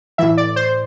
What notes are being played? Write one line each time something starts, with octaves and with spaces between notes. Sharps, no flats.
A2 E3 E5
D5
C5